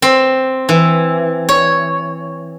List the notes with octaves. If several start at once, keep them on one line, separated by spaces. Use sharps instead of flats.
C4
E3
C#5